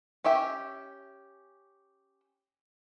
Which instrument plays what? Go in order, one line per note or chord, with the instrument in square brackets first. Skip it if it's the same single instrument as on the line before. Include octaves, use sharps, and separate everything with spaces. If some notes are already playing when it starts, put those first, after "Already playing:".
[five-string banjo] C#4 G4 E5 G5